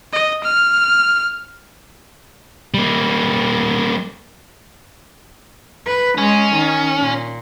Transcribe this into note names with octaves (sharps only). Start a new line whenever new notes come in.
D#5
F6
G3 A#3
B4
G#3 C#4
D#3
A#2